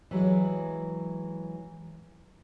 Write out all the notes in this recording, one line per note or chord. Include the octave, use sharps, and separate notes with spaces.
E3 F#3 G#3